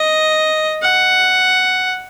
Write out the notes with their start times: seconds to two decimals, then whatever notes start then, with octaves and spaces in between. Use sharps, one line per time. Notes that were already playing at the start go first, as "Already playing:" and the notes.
Already playing: D#5
0.82 F#5